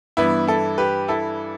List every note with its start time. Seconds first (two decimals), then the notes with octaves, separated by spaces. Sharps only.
0.17 G2 E3 B3 E4
0.47 E4 A4
0.78 G4 B4
1.08 E4 A4